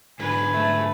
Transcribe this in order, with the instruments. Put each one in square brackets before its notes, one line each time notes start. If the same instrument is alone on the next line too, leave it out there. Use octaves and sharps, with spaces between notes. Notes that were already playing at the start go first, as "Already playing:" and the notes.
[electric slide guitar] G#2 D3 F#3 [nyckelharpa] B4 [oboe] G#5
[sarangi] A3